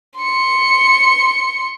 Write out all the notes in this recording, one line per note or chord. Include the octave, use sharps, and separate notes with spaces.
C6 C#7